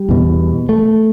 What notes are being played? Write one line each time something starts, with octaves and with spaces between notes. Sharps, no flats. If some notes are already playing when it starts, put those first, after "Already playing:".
Already playing: G3
E2 B2
A3